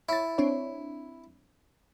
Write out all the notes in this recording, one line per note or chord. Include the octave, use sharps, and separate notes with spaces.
E4 C#5 A6
C4 D4 C#5